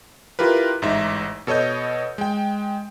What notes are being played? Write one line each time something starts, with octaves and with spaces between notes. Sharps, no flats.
E4 F4 G4 A#4 B4
A1 G#2 D#4 E5
B2 A4 C#5 D#5 G6
G#3 G5